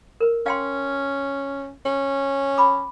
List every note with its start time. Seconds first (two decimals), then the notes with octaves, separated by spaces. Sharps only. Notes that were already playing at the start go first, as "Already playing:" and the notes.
0.20 A#4 B4
0.46 C#4 F5 G5 C6
1.86 C#4
2.58 B5 D6